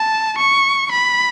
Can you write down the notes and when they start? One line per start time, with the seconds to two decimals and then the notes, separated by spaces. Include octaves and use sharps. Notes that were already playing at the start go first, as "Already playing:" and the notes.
Already playing: A5
0.38 C#6
0.91 B5